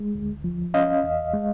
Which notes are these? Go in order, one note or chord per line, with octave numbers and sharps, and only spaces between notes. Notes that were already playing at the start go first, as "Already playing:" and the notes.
Already playing: G#3
D2
F3
C#4 D#5 F5
E2
G#3